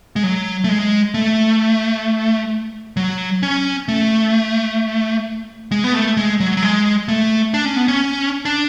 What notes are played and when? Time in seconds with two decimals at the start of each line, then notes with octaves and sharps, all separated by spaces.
0.16 G#3
0.23 F#3
0.64 A3
0.69 G#3
1.14 A3
2.97 F#3
3.43 C#4
3.88 A3
5.71 G#3
5.84 B3
5.94 A3
6.17 G#3
6.40 F#3
6.57 F#3
6.63 G#3
7.08 A3
7.54 D4
7.65 C#4
7.76 B3
7.88 C#4
8.45 D4